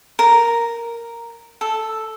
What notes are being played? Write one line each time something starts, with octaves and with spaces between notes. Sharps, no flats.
A#4
A4